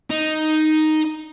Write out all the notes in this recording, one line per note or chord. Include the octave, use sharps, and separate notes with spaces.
D#4